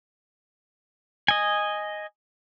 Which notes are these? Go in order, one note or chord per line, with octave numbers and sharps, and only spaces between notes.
D#5 G#5